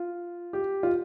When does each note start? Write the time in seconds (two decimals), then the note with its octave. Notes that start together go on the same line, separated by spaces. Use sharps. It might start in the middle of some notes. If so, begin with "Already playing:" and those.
Already playing: F4
0.53 G4
0.83 F4